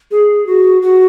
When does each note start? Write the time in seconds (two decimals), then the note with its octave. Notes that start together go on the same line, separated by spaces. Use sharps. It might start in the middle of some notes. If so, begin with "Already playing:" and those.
0.11 G#4
0.47 F#4
0.82 F#4